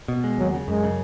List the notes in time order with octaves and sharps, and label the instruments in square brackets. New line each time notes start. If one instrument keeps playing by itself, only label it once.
[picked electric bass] B2
G#3
[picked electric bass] D#2 [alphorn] F#3
[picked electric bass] C#3
[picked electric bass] F#2 [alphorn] G#3
[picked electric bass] C#3